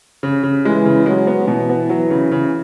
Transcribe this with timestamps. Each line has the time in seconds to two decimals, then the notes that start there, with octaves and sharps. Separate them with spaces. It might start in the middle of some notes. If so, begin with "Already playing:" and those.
0.23 C#3
0.43 C#3
0.65 E3 G#3
0.86 C#3
1.06 F#3 G#3
1.27 B3
1.48 B2 E3
1.69 B3
1.89 F#3
2.10 C#3
2.32 C#3